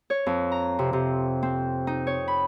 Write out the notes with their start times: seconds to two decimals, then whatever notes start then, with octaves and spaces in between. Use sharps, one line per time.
0.10 C#5
0.26 F2
0.52 A#5
0.79 C3
0.93 C3
1.43 C4
1.87 D#4
2.07 C#5
2.28 B5